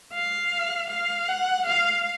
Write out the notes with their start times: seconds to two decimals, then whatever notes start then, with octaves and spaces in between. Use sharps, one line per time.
0.14 F5
0.90 F5
1.28 F#5
1.66 F5